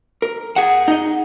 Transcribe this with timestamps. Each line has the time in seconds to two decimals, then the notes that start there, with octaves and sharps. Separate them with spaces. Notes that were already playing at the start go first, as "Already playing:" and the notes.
0.22 A#4
0.56 G#4 F#5
0.88 D#4 D#5